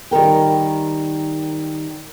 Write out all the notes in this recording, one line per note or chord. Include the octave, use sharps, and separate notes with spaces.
D#3 G3 A#4 G5